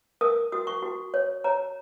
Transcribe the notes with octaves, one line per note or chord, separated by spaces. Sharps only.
A#4 D#6
F#4 D#6
C#6
F#4
C#5
C#5 A#5